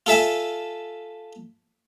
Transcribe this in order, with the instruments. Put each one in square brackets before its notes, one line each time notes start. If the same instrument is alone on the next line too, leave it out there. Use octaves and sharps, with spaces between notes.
[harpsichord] F4 A4 E5 G#5